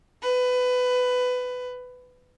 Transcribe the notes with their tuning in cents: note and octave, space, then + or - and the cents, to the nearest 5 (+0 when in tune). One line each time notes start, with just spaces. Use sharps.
B4 +20